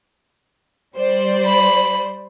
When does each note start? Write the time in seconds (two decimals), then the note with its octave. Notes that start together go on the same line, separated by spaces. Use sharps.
0.95 G3 C5 D5
1.46 B5